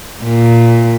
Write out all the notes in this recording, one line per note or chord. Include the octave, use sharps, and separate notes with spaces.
A#2